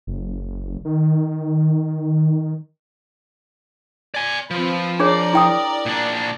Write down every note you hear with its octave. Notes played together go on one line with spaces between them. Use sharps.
F#1
D#3
D5 G#5
F3 C4 F4 B4
D4 G#4 A#4 C#5 D5
E4 G5 D#6
A#2 D4